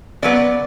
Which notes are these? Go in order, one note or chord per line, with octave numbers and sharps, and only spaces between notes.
C#3 F#3 B3 D5